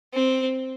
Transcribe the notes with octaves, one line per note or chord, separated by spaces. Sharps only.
C4